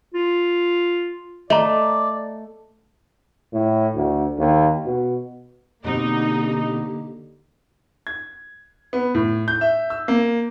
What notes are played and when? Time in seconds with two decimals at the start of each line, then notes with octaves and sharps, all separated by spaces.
0.14 F4
1.50 A3 D5 D#5 A#5
3.53 A2
3.95 D2
4.39 D#2
4.85 B2
5.84 B2 D3 A#3 C4 D#4 G4
8.07 G#6
8.93 B3
9.15 A2
9.48 G6
9.61 E5
9.90 E6
10.08 A#3